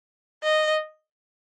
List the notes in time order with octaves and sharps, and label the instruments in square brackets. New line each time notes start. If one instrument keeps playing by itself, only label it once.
[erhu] D#5